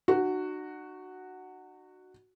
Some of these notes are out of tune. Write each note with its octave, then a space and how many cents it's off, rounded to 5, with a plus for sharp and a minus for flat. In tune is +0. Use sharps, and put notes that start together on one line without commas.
D#4 -45 F#4 +0